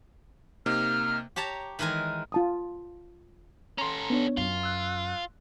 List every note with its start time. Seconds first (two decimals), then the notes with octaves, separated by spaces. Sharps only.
0.66 C3 A#3 D#4 F6
1.36 G4 C#5 A5 A#5
1.79 D#3 E3 G#3 A#4 G#5
2.32 F4 A5 D#6
3.78 C#4 A4 A#5 C6
4.10 B3 D4 C#5
4.37 F#2 F4
4.63 E6 F#6